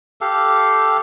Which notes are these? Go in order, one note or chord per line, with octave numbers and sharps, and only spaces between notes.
G4 A4 F5